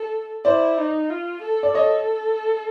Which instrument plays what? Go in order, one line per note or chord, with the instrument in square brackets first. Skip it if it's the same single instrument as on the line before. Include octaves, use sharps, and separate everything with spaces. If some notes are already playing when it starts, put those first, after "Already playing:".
Already playing: [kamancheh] A4
[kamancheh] E4 [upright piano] C5 D5
[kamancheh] D#4
F4
A4
[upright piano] D5
[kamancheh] A4 [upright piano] C#5 D#5